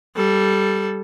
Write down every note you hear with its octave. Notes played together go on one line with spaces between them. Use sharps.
G3 A4